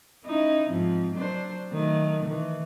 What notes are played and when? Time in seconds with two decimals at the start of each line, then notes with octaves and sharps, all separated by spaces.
0.25 C#4 D#4 E4
0.68 G#2 F3 C4
1.14 F#3 D4 C5
1.72 D#3 F#3 A3
2.25 D#3 E3